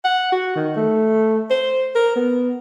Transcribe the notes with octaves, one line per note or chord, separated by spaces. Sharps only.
F#5
F#4
D#3
A3
C5
A#4
B3